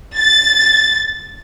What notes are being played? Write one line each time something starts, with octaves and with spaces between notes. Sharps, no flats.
A6